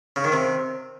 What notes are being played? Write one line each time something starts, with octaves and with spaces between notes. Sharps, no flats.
C#3
D#3
C3